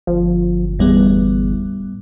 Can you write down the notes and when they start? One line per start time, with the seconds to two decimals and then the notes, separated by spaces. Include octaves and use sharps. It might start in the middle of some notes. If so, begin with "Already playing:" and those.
0.07 G1 F3
0.79 E2 A2 G3 B3